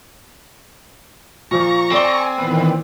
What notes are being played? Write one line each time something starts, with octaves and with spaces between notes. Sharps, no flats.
A#2 F3 A#5 C#6
C4 A4 D5 G#5 G7
A#2 D#3 E3 B3